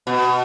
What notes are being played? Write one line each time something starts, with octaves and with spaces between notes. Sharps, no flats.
B2